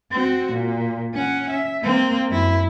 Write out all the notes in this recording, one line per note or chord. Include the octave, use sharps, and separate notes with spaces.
C4 F#4
A#2
C#4 F#5
E5
A#3 C4
F#2 E4